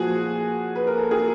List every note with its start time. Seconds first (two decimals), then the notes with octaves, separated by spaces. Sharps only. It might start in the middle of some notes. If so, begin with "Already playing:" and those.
Already playing: A#2 F3 F#4 G#4
0.76 B4
0.87 A#4
0.98 A4
1.11 G#4 A#4